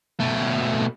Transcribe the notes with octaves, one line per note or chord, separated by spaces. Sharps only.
B2 A3